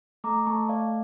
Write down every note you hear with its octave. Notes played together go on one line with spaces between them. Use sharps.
A3 A#5 D6
A3 A5 C#6
A3 D5 F5